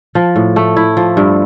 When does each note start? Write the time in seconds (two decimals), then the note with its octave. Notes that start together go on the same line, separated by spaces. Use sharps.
0.15 F3
0.36 A2
0.56 A3
0.76 E4
0.97 F3
1.17 G2